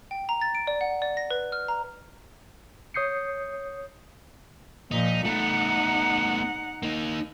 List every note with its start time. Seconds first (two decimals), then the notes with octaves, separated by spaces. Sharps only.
0.11 G5
0.29 A#5
0.41 A6
0.55 D7
0.67 D5
0.81 F#5
1.02 D5
1.17 A#6
1.31 B4
1.52 F6
1.68 A#5
2.94 C#5 D#6 G6 C7 C#7
4.91 A#2 F3 D#4
5.25 A3 B3 D#4 F#5
6.82 A#3 D#4